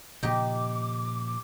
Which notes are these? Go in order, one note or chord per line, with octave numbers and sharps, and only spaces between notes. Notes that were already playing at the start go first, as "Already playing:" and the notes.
A#2 C#3 F3 D#4 G4 D6